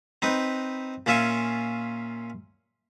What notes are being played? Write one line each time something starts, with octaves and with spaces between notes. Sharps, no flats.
C4 D#4 B4
A#2 C#4 F4 E5 G#5 C#6